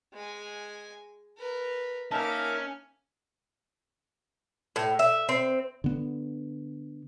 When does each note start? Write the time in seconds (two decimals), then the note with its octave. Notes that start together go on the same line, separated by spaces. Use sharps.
0.13 G#3 G#5
1.38 A#4 B4
2.11 A#3 C#4 D#4 A#4 E5 A5 D6 F6
4.76 A2
4.99 E5
5.29 C4
5.84 D3 B3